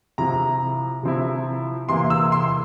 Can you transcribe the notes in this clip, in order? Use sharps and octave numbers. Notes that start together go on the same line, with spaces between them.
C3 F3 C4 E4 A#5
C3 F3 C4 E4
C3 E3 A#3 E4 C6
E6
C6